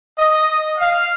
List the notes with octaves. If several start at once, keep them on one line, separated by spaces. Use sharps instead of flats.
D#5
F5